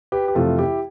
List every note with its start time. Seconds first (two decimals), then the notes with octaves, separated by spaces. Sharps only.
0.12 G4 B4
0.28 G4
0.35 F2 C3 E3 A3 F4 A4
0.58 E4 G4